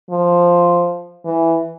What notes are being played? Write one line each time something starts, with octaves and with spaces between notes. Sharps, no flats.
F3
E3